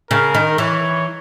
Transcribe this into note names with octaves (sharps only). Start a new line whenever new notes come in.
C#3 A#4
D#3
E3 C#5